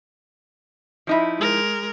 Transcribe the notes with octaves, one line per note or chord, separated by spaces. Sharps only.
F3 D#4 E4
G#3 A#4